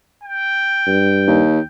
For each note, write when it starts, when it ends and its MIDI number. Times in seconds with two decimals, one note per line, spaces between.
0.24 1.67 79
0.87 1.42 43
1.27 1.60 39